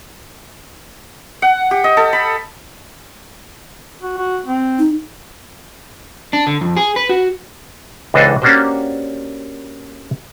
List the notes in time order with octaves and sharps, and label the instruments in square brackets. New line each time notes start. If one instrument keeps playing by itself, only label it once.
[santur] F#5
G4
D#5
A4
B5
[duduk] F#4
F#4
C4
[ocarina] D#4
[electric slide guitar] D4
D3
F2
G#4
B4
F#4
[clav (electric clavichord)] C#2 E3 D4 A4 C5 D#5
A#3 C#4 D4 F#4 G4 C5